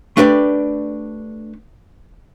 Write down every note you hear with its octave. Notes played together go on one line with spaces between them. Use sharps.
A3 D4 G4 B4 D5